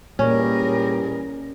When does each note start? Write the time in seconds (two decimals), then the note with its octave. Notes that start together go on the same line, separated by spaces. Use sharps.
0.19 A#2 E3 G3 A#3 C#4 G#4 A#4